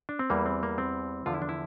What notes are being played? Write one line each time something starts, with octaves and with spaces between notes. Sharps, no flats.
D4
C4
E2 E3 G3 A#3
C4
A#3
C4
E2 D3 F3 F4
E4
D4
E4